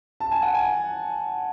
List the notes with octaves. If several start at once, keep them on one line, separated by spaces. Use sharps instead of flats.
A5
G#5
F#5
G#5